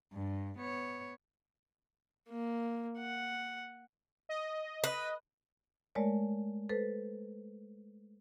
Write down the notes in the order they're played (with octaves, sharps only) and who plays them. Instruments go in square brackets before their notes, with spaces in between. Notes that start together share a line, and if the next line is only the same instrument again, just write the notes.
[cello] G2
B3 C#5
[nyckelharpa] A#3
F#5
[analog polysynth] D#5
[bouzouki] B4
[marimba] G#3 A3 A#4 C#5 D5
A4 B4 C5